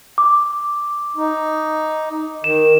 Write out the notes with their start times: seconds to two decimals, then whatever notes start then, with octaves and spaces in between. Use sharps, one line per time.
0.18 D6
1.17 D#4
2.44 D#3 E7